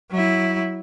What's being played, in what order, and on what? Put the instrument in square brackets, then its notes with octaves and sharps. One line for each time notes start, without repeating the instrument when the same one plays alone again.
[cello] F#3 E4